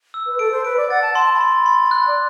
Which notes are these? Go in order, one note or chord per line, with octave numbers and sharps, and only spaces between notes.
E6
B4
A4 D7
C5
B4 D7
D5
F#5 A6
A5
A5 C6
A5
B5
C6
B5
C6
F#6
D5